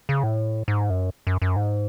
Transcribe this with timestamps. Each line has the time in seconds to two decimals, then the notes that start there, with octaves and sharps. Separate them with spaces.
0.09 C#3
0.23 A2
0.68 G#2
0.90 F#2
1.27 F#2
1.42 F#2
1.56 G#2